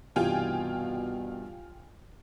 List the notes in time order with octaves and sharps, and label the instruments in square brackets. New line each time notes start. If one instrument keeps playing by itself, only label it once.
[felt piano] C2 G2 E3 [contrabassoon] B2 [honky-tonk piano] F4 G5 G#5